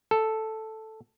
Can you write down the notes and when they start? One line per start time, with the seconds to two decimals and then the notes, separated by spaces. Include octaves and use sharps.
0.11 A4